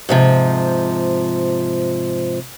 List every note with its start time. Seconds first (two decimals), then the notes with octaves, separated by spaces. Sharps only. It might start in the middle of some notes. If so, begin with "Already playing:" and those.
0.09 G#2 C3 F3